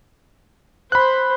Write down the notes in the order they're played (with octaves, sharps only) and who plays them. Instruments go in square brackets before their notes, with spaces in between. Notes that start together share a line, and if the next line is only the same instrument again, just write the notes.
[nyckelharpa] C5 [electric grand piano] B5 F#6